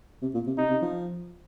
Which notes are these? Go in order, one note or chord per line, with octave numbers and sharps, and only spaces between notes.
C3
A#2
C3
C3 D#4
C3
F3